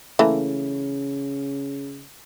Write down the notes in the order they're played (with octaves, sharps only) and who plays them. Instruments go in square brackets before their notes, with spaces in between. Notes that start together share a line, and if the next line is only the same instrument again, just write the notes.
[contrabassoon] C#3 [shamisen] E3 A3 A#3